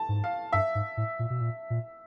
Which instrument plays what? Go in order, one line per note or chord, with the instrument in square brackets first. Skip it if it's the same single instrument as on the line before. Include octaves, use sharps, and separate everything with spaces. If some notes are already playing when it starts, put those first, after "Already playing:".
Already playing: [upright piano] A5
[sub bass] G#2
[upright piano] F5
[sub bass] G2 [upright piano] E5
[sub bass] G#2
A2
A#2
B2
A#2
A#2